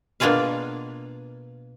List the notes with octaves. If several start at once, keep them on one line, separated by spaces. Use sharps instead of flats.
B2 A#3 D4 F4 G#4 F5